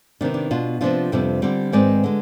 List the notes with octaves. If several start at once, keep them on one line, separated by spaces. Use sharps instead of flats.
C3 D#3 B3 D4
D4
B2 B3 D4 F4
C3 F3 B3 D4 F4
F2 C3 G3 B3
D3 G3 C4
G#2 D#3 G#3 C4 B4 D5
D3 G#3